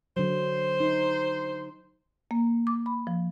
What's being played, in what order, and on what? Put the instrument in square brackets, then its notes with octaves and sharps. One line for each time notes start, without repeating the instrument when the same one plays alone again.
[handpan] D3 F#3 [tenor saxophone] C5
[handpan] D#4
[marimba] A#3
D6
B5
F3